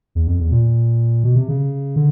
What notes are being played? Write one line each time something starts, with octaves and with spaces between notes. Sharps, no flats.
E2
F2
E2
A#2
B2
C3
C#3
D3